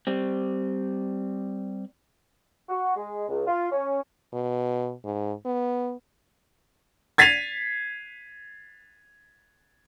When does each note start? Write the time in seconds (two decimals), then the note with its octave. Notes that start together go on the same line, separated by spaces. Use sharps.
0.07 G3 C4
2.69 F#4
2.96 G#3
3.29 C#2
3.47 F4
3.71 C#4
4.33 B2
5.05 G#2
5.46 B3
7.18 G#6 A6 B6 C7 D#7 F7